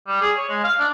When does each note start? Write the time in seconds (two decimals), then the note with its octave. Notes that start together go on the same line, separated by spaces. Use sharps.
0.07 G3
0.21 G#4
0.37 C#5
0.49 G#3
0.64 F5
0.79 D4